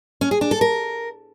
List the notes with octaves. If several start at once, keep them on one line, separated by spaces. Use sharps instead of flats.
C#4
G#4
D4
A4
A#4